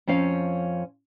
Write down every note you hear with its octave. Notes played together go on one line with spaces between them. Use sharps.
F2 F3 C#4 F5